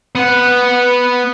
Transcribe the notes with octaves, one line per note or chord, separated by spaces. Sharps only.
B3 F#5